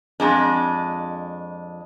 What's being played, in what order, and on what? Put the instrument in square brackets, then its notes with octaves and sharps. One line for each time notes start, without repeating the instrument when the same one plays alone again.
[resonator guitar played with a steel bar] F2 G#3 D4